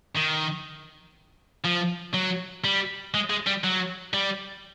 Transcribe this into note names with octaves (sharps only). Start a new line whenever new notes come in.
D#3
F3
F#3
G3
G#3
G#3
G3
F#3
G3